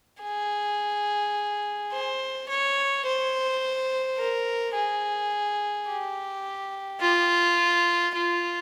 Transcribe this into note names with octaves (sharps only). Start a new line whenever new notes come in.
G#4
C5
C#5
C5
A#4
G#4
G4
F4
F4